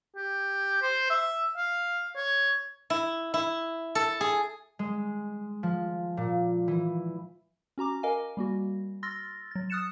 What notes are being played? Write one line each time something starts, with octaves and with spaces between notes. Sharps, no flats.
G4
C5
E5
F5
C#5
E4
E4
A4
G#4
G#3
F3
A#2
E3
C#4 F#4 A#5 D6
A#4 D#5 F5 G#5
G3 A#3 F#4
C6 E6 F6 A6 A#6
F#3 A6
D#6 F6 F#6 A6 C#7 E7